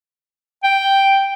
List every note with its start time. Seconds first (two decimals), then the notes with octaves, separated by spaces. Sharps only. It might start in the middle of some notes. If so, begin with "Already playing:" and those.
0.63 G5